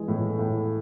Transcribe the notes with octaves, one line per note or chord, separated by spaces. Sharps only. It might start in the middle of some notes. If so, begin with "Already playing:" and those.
Already playing: E3 G#3
A2
A2